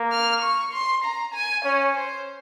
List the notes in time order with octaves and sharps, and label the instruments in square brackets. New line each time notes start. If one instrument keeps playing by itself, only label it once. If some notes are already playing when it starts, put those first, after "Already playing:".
Already playing: [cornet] A#3
[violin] F6
C#6
C6
A#5
G#5
[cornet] C#4 [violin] C#5
[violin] C5